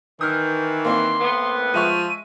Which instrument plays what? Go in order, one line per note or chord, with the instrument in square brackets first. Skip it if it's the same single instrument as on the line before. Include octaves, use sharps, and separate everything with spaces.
[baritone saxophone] D#3 [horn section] E3 [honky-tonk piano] D#6 F6 [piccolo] G6
[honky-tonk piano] A#3 C4 E4 [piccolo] C6
[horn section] A2 B3
[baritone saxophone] F3 [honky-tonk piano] G#3 E5 C#6 [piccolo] D#7